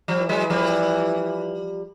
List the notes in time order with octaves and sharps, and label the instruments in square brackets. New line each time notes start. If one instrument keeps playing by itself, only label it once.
[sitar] F3 G3
[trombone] E3
[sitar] F#3 G#3
F3 G3